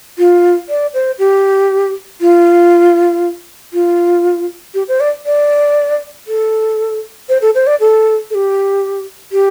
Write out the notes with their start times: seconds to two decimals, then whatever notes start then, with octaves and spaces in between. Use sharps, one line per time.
0.18 F4
0.69 D5
0.94 C5
1.19 G4
2.21 F4
3.73 F4
4.74 G4
4.88 C5
5.00 D5
5.26 D5
6.27 A4
7.29 C5
7.42 A4
7.55 C5
7.67 D5
7.80 A4
8.30 A4
8.35 G4
9.32 G4